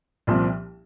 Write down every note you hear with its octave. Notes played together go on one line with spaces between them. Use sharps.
C2 A#2 F3 C4